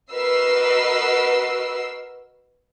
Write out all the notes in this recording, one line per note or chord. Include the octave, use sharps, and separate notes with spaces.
F#4 A#4 B4 D#5 E6 C7